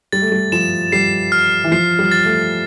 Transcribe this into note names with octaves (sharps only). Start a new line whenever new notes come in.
G3 A6
A3
G3
F3 E7
G3 C7
F6
E3
F3 C7
G3
A6
A3